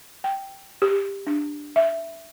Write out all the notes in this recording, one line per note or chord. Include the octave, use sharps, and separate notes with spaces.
G5
G4
D4
E5